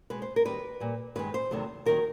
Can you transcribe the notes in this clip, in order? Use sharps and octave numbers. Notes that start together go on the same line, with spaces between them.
B2 G#3 B4
C5
A#4
D#2 D#3 G3 B4
A#2 G3
G2 D#3 G#3 B4
C5
E2 C3 D#3 F#3 A3
D#2 D#3 F#3 A#4